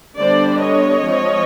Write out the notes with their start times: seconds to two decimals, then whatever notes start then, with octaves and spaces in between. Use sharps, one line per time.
0.18 D3 G3 B3 D4 C5 D5
0.61 C#5 D#5
1.03 F3 G#3 C4